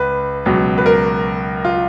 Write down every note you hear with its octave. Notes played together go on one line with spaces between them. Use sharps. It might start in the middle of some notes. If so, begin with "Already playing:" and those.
Already playing: C#2 B4
C#2 B2 F#3
B4
A#4
F4